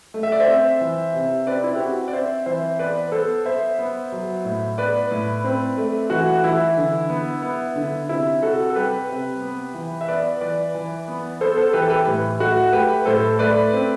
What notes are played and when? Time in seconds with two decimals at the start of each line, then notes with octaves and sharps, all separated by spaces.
0.14 A3
0.23 E5
0.32 D5
0.40 C5 E5
0.48 C4
0.81 E3
1.14 C3
1.47 C4 B4 D5
1.64 E4
1.75 G4
1.79 C4 F#4
2.08 D5
2.13 C4 C5 E5
2.46 E3 C5 E5
2.79 B3 B4 D5
3.12 B3 A4 C5
3.45 B3 C5 E5
3.79 B3
4.12 F#3
4.45 A2
4.78 B3 B4 D5
5.11 A2
5.44 C4
5.77 A3
6.10 E3 F#4
6.44 E3 E4
6.77 D3
7.10 B3
7.42 B3
7.76 D3
8.09 C3 E4
8.42 C3 F#4 A4
8.70 A4
8.75 G3 G4 B4
9.09 C3
9.41 B3
9.74 E3
10.01 E5
10.08 B3 B4 D5
10.41 E3 B4 D5
10.75 E3
11.08 B3
11.41 B3 A4 C5
11.57 A4 C5
11.73 E3 G4 B4
11.82 A4
11.90 G4 B4
12.07 A2
12.39 A3 F#4
12.73 A3 G4 B4
13.05 A2 A4 C5
13.39 A3 B4 D5
13.73 C4